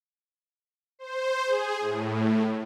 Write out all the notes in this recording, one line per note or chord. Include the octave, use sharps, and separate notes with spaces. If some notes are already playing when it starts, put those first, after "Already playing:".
C5
G#4
A2